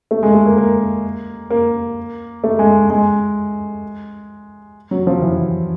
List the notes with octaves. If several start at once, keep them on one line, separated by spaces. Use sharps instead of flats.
A3
G#3
A3
A#3
A#3
A#3
A3
G#3
G#3
F#3
F3
E3